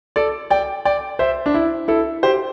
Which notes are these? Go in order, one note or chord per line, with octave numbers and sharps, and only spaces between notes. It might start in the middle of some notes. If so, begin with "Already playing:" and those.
A4 D5
D5 G5
D5 G5
C5 E5
D4
E4
E4 A4
G4 C5